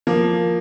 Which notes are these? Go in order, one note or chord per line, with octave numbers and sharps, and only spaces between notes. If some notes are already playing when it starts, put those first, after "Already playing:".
F3 A#3